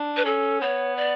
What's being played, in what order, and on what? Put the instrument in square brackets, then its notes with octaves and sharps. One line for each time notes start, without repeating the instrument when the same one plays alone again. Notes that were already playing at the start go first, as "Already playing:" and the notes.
Already playing: [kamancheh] D4
[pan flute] B4
[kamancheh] C#4 [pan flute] A4
[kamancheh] B3 [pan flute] C#5
[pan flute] D5